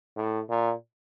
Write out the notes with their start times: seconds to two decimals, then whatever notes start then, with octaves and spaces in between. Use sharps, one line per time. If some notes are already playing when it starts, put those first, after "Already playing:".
0.16 A2
0.50 A#2